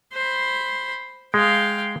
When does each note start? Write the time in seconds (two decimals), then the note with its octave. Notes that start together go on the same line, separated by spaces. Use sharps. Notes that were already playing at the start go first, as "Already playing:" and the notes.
0.13 C5 B5
1.34 G#3 F5 G5